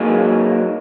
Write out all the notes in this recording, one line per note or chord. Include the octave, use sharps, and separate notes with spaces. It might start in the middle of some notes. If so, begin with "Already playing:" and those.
Already playing: F#3 A#3 D#4 G#4